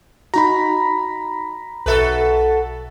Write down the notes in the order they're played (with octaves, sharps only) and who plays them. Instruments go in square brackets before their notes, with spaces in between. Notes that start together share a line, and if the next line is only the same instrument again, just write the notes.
[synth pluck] D#4 F#4 [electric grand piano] A#5 B5
[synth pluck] B1 E5 A6 [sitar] F#4 A4 B4